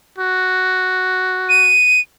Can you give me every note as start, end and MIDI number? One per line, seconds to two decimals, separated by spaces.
0.18 1.77 66
1.49 2.00 99